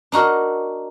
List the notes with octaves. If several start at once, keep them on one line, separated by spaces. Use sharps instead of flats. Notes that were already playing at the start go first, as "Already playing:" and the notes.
D4 D#4 F#4 A#4